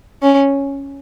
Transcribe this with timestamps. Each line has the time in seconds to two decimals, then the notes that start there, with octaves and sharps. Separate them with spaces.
0.22 C#4